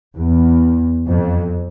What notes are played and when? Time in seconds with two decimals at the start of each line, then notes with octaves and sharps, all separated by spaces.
0.16 E2
1.07 F2